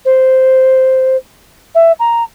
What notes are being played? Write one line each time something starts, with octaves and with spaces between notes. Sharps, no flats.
C5
E5
A#5